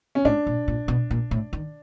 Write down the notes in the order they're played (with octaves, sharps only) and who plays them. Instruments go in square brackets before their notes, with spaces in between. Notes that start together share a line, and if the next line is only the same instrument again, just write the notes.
[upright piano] C#4
[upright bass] A2 [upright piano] D4
[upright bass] A#2
A#2
B2
A#2
A2
D#3